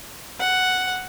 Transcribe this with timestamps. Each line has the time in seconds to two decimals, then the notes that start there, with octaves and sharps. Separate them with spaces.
0.39 F#5